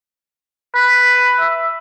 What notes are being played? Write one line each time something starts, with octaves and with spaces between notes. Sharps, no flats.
B4
E5